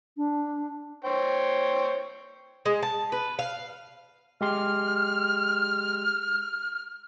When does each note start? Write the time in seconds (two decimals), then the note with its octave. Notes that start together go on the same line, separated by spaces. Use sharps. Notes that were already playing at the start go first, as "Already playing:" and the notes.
0.17 D4
1.05 C5 C#5 G5
2.66 G#3
2.83 A5
3.12 B4
3.39 F5
4.41 G#3 G4 C6 F6